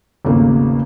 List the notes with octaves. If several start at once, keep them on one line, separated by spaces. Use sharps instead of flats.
G#1 E2 C#3 A3 A#3